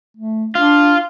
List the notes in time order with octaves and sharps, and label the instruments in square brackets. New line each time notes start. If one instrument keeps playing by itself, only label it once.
[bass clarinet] A3
[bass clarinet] D4 [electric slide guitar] F4